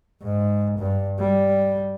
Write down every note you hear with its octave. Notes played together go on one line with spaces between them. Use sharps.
G#2
G2
G3